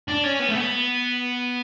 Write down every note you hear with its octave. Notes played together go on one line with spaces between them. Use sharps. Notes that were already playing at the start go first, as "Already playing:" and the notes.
D4
C#4
B3
A3
B3